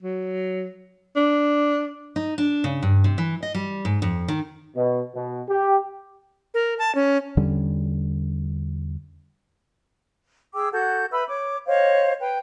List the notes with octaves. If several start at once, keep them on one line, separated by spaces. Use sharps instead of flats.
F#3
D4
D#4
D4
C#3
G2
C3
E3
D#5
G3
G#2
F2
D#3
B2
B2
G4
A#4
A5
C#4
E2 D3 G3 C#4
G#4 G5 D6 E6
F#4 A4 F#5 G6
B4 E5 B5 E6
C#5 D6
C5 C#5 D#5 F5
B4 G5